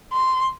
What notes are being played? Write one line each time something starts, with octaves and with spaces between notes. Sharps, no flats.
C6